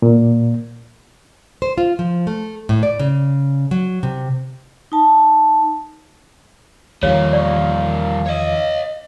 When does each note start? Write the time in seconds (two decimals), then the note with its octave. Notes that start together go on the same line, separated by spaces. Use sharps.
0.02 A#2
1.62 C5
1.78 F4
1.99 F3
2.27 A3
2.69 A2
2.83 D5
2.99 C#3
3.71 F#3
4.03 C3
4.92 D#4 A5
7.03 E2 D#3 F3 G3 A#3 C#5 F5
7.33 D5 C#6
8.26 C#5 D#5